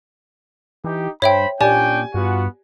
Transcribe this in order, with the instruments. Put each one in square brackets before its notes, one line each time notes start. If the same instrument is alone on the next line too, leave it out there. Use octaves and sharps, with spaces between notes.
[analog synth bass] E3 [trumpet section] D#4 G4
[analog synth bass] G2 [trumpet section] C5 B5 [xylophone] C#5 E5 G5
[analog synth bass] A#2 [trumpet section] C#4 D4 G5 [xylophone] G4 D5 [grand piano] G#5
[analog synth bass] G2 [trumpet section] B3 F4 F#4